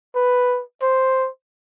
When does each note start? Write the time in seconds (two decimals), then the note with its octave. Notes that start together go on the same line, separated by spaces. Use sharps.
0.15 B4
0.82 C5